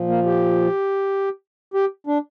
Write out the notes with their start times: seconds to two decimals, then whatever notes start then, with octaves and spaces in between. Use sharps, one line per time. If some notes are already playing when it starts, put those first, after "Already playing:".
Already playing: A#2 F3
0.08 A#3
0.25 G4
1.74 G4
2.07 D4